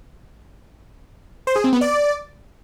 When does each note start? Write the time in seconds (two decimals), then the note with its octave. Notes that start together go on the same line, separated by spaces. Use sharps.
1.47 C5
1.56 G#4
1.64 C4
1.73 B3
1.81 D5